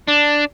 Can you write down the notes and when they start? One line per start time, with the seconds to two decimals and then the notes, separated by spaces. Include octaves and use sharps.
0.08 D4